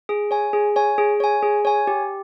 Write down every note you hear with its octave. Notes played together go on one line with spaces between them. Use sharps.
G#4
C#5 G#5
G#4
C#5 G#5
G#4
C#5 G#5
G#4
C#5 G#5
G4